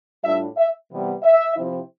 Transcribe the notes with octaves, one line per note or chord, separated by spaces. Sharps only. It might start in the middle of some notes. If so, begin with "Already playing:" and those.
A2 G3 D4 F4 E5
E5
C3 E3 G3 B3
E5
C3 F3 C4 E4